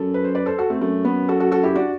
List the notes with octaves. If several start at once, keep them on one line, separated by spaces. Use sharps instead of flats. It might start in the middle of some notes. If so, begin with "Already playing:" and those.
Already playing: F#2 A4
B4
C5
B4 D5
A4 C5
F#4 A4
A3 C4
F#2 A3
B3
F#4 A4
F#4 A4
F#4 A4
E4 G4
D4 F#4